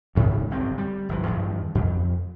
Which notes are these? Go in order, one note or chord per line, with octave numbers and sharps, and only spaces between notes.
D2 G#2 C#3
G1 F#2 C4
G3
G1 E3 F3
E2 G2 D#3 F3
F2